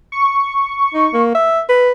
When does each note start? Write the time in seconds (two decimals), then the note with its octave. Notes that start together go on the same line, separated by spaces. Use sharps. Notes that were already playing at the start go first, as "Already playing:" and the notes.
0.12 C#6
0.94 D#4
1.13 A#3
1.34 E5
1.69 B4